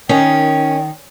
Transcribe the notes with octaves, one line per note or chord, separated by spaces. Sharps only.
D#3 C#4 G5